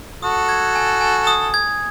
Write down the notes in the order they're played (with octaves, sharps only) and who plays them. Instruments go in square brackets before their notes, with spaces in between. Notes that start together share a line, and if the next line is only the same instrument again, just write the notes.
[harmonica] F#4 A4 [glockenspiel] D#6
[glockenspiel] G#6
G#5
G#5
D#6
G#6